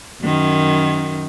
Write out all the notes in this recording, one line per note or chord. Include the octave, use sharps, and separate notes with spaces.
F#2 D#3